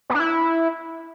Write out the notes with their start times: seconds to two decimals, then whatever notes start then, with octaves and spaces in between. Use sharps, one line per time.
0.10 B3
0.15 D4
0.20 E4